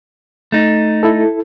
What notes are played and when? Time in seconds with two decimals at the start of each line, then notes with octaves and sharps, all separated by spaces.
0.52 A3 D#4
1.03 E4 A4